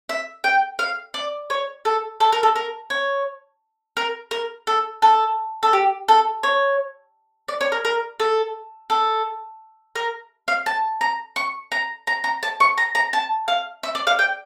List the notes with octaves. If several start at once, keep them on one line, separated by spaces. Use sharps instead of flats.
E5
G5
F5
D5
C#5
A4
A4
A#4
A4
A#4
C#5
A#4
A#4
A4
A4
A4
G4
A4
C#5
D5
C#5
A#4
A#4
A4
A4
A#4
F5
A5
A#5
C#6
A#5
A#5
A#5
A5
C#6
A#5
A#5
A5
F5
E5
D5
F5
G5